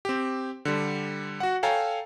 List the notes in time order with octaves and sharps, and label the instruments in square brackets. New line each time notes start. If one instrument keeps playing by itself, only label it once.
[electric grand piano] C4 G4
D3 G3
F#4 F#5
A4 C#5 F5 G5 G#5 A#5